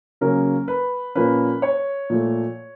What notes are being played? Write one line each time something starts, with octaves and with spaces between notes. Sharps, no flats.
C#3 F#3 A#3 C#4 A#4
B4
A#2 F3 A#3 C#4 B4
C#5
A#2 F3 A3